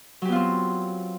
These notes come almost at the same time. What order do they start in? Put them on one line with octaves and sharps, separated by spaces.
F#3 G4 B3 F4 C4